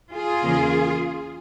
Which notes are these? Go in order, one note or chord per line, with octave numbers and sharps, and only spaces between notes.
F4 G#4
E2 C#3 E3 A#3